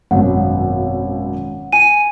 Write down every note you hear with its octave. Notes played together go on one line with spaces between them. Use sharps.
G#1 F#2 B2 F#5
G#5 D#7